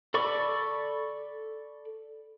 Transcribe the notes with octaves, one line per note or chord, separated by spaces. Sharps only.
A4 D5 B5 C#6 D6